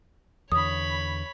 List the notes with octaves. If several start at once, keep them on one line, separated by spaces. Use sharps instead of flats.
E2 D3 C#5 B5 D#6